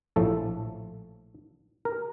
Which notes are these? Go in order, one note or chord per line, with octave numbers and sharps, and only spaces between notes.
A#1 A2 F3 A3 A4
A#4